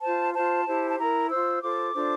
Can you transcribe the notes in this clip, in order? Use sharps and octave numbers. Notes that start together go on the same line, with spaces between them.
F4 C5 A5
F4 C5 A5
E4 G4 C5
A5
E4 A#4 A#5
F4 C5 E6
F4 A4 C5 D6
D4 F4 A4 C5